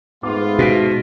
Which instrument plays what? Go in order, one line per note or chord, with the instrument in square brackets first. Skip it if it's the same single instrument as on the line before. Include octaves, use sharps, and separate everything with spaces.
[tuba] G#2 [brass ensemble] A3 B3 F4 [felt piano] D6
[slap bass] B2 [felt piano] F#4 B6 D7